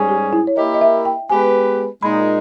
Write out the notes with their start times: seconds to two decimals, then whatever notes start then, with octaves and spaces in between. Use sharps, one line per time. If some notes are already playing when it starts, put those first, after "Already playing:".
Already playing: G#2 G3 C#4 G#4
0.09 G4
0.33 E4
0.47 C#5
0.57 A#3 E4 G4 A#4 D#5
0.74 D#5
0.81 E5
1.05 G5
1.30 G#3 B3 G4 B4 G#5
2.03 A#2 G#3 D#4 B5